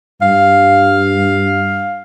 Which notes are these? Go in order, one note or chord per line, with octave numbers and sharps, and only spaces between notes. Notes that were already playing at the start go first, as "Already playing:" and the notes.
G2 F5